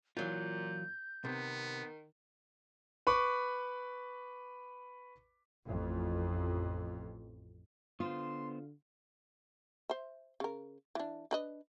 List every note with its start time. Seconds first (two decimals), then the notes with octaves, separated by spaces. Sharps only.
0.17 A#2 E3 F#3 F4 G6
1.25 C3 D#3 B3
3.07 B4 B5 C#6 D6
5.68 A1 F2
8.00 D3 B3 F4 C5 C6
9.90 C5 E5
10.40 C#3 A#4
10.95 E3 D4
11.31 D4 B4 D#5